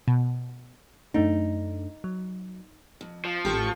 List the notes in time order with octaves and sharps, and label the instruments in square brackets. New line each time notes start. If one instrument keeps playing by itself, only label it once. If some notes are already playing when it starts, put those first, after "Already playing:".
[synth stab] B2
[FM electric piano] F#2 A3 D4 [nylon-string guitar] D#4
[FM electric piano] F#3
[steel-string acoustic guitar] F2
[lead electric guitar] F3
[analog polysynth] A1 C#6 [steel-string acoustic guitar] G4 A4 F5